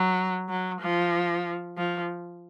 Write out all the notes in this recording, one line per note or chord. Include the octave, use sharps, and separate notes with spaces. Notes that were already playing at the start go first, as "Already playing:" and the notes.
Already playing: F#3
F#3
F3
F3